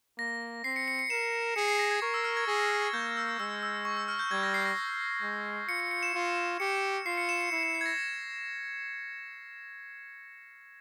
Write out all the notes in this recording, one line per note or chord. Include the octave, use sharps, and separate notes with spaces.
A#3 A#6
C4 C7
C#7
C#7
C#7
A#4 E7
G#4 C#7
C7
A#6
G#6
A#4 C#6
E6
F6
G#6
G#4 A#6
A#6
F6
G#6
A#3 G6
E6
G#3 E6
E6
C#6
E6
F6
G6
G3 G#6
A#6
C7
A#6
G#3
F4 C#7
C#7
C#7
E7
F4
G4 C#7
F4 C7
C#7
E7
C#7
E4 C#7
C#7
C7
G#6
A#6